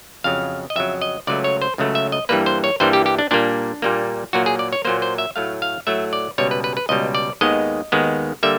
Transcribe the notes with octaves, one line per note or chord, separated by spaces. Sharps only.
F2 C#3 F#3 F5
D#5
F2 C#3 F#3 E5
D#5
C#2 C#3 F#3 A3 D5
C#5
C5
C#2 C#3 F#3 A3
E5
D#5
G2 E3 G3 A#3 B4
C5
C#5
G2 E3 G3 A#3 C5
G4
G4
D4
A#2 G3 A#3 D4
A#2 G3 A#3
A#2 F#3 A#3 F#4
G#4
D5
C#5
A#2 F#3 A#3 C5
C5
E5
A2 F#3 A3 F5
F5
A2 F#3 A3 E5
D5
C#2 B2 G3 C#5
B4
B4
B4
C#2 B2 G3 D#5
D5
D#2 D#3 G#3 B3 D#5
D#2 D#3 G#3 B3
D3 G3 A#3 E5